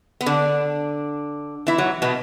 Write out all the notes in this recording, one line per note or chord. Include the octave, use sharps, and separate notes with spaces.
B3
D3 D4
E3 E4
F#3
B2 B3